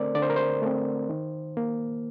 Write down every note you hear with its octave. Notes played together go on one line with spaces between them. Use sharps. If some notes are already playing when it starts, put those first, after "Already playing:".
Already playing: D3 A3 C4 A#4 C5 D5
D3 D5
C5
A#4
C5
A3 C4
D#3
A#3